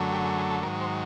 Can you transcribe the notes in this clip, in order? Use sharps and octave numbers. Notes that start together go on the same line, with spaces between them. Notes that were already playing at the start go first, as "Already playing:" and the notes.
Already playing: F#2 D3 F#3 A3
G4
G#4
G#4
A4
G#2 D#3 F#3 A#4
C5